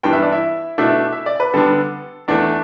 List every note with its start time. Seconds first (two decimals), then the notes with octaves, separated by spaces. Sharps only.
0.03 G2 E3 G3 B3 D4 G5
0.13 E5
0.23 D5
0.32 E4 E5
0.78 B2 A3 D4 E4 E5
1.12 E5
1.26 D5
1.40 B4
1.53 D3 G3 B3 D4 A4
2.28 E2 E3 A3 D4 D5